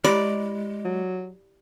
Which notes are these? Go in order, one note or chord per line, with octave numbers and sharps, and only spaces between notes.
G#3 E4 G4 D5 B5
F#3